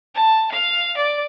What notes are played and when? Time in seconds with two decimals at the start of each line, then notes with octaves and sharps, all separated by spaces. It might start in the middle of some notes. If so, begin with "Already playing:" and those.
0.15 A5
0.52 F5
0.97 D5